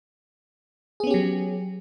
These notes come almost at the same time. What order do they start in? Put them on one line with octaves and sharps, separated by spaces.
G#4 B3 C#4 G4 F#3